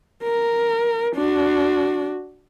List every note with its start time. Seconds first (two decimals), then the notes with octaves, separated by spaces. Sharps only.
0.24 A#4
1.16 D4 F#4